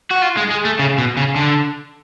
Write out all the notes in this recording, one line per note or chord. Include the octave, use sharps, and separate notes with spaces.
F#4
F4
G#3
G#3
A3
C#3
B2
C#3
D3